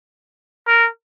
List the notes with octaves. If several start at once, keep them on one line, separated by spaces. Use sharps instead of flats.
A#4